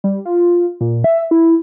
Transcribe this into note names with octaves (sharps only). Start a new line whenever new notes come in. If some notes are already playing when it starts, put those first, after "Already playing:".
G3
F4
A#2
E5
E4